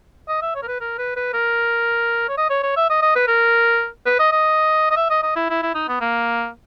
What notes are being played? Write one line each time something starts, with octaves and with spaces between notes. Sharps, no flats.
D#5
E5
C#5
A#4
B4
A#4
B4
B4
A#4
C#5
D#5
C#5
C#5
E5
D#5
D#5
B4
A#4
B4
D#5
D#5
D#5
E5
D#5
D#5
E4
E4
E4
D#4
B3
A#3